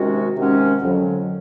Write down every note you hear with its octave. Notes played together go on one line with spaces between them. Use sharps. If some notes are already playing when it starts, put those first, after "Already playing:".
Already playing: C3 D#3 G#3 C#4 F#4
C3 D#3 G#3 C#4 F#4
F2 D3 F#3